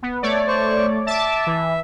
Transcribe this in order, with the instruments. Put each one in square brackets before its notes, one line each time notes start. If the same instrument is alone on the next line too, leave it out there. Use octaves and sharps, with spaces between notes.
[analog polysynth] B3
A3 C#5 D5
[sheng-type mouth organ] C5 C#6
[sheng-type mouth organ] E5 [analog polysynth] A5 D6
[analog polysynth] E3